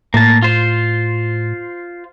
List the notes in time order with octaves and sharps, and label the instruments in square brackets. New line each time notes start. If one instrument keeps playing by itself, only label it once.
[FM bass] A2 [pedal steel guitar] A#3 A5
[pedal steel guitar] F4 C5